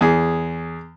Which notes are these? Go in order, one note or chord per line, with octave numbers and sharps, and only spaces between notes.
E2 G#4